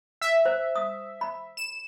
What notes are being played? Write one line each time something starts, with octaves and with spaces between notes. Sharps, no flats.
E5
C5
D#6
B5
E7